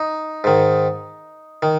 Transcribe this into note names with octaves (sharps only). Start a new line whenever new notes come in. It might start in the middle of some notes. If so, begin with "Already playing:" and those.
Already playing: D#4
G#2 D#3
D#3